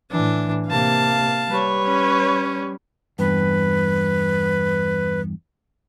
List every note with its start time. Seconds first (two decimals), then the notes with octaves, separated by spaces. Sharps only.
0.11 A2 E3 D4
0.68 C3 A#3 F5 A5
1.50 G3 B4 C#5
1.85 C#4
3.19 E2 G2 B4